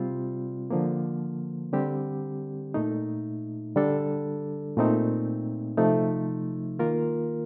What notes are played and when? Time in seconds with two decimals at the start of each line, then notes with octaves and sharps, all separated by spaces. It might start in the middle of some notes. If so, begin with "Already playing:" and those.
Already playing: C3 G3 C4 F4
0.70 D3 F3 A#3
1.73 D3 G3 C4 G4
2.74 A#2 A3 D#4
3.76 D3 G3 D4 A4
4.77 A#2 A3 C4 D#4
5.77 C3 F3 A3 D#4
6.79 D#3 A#3 F4 A#4